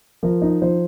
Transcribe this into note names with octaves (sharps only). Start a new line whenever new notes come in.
F3 A#4
D#4
F3 C5